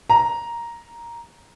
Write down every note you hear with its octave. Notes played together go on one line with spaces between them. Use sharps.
A#5